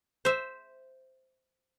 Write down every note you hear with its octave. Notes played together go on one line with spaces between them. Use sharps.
C5 E5